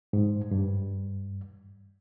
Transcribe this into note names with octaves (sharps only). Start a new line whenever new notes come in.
G#2
G2